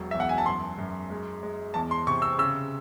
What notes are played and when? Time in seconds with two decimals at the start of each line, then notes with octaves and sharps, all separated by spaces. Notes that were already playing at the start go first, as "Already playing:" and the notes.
Already playing: E1 F#3
0.11 E2 E5
0.20 F#5
0.29 G#5
0.38 A5
0.46 F#2 C6
0.79 F#2
1.10 G#3
1.43 G#3
1.74 E2 A5
1.91 C6
2.07 C3 C#6
2.22 E6
2.38 C#3 E6